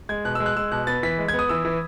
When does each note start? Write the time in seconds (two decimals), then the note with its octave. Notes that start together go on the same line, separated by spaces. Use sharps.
0.09 G#3 G#6
0.25 B2 F#6
0.35 E6
0.40 G#3
0.46 F#6
0.56 G#3 E6
0.72 B2 F#6
0.87 B3 A6
1.03 E3 B6
1.19 G#3
1.28 G#6
1.33 B3
1.39 D#6
1.49 E3 E6
1.65 E3